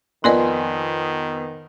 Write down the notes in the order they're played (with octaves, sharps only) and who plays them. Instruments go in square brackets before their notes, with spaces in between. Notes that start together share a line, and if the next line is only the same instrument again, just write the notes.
[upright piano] F2 B3 [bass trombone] D#3 [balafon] A#4 D5 D#5 [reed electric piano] G#5 C6